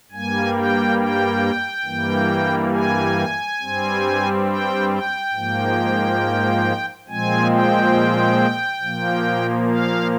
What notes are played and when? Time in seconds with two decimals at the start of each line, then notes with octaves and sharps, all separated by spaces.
0.11 G2 G3 A#3 G#5
0.55 G5
0.99 G5
1.85 G2 E3 G3 A#3
2.72 G#5
3.60 G2 G3 C4
4.46 G5
4.90 G5
5.34 G#2 F3 A#3
7.08 A#2 F3 G#3 C4 G#5
7.51 G5
8.82 A#2 F3 A#3
9.68 F5